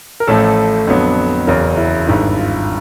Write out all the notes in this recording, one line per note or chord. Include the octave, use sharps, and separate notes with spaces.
A#4
A1 A2 F3 A3 A4
F2 D3 F#3 B3
F#1 E2 C#3 F#3 A#4
E4
G#1 G2 D#3 E4
F4